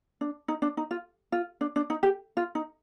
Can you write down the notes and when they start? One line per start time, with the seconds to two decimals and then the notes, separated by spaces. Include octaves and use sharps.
0.21 D4
0.48 D#4
0.62 D4
0.77 D#4
0.91 F4
1.32 F4
1.61 D4
1.76 D4
1.90 D#4
2.03 G4
2.37 F4
2.55 D#4